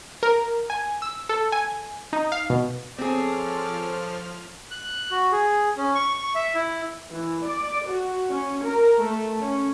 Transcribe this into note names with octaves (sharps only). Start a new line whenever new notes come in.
A#4
G#5
E6
A4
G#5
D#4
F5
B2
F3 C4 G#4 A4 C#5 D5 F6
F#6
F#4
G#4
C#4
C#6
C#6
E5
E4
E3
D5
F#4
C#4
A#4
A3
C#4